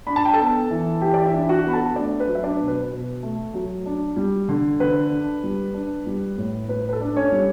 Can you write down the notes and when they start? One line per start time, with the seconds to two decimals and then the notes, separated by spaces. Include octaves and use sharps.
0.07 D4 B5
0.16 A5
0.25 G5
0.33 A4 A5
0.39 B3
0.70 E3
1.01 E3 G4 G5
1.14 D5
1.25 E4 E5
1.34 D4
1.49 F#4 F#5
1.64 B3 B5
1.73 A4 A5
1.96 A3 D4 D5
2.20 B4
2.27 F#3
2.35 E5
2.43 D4 D5
2.60 B2
2.68 B4
2.91 B2
3.23 A3
3.54 F#3
3.86 D4
4.16 G3
4.49 D3
4.80 D3 B4
5.11 D4
5.44 G3
5.74 D4
6.06 G3
6.38 A2
6.69 A2 B4
6.89 B4
6.93 A4
7.01 D4
7.16 C#4 C#5
7.32 G3